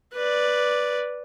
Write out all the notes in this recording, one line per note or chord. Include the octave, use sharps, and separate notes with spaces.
B4 D5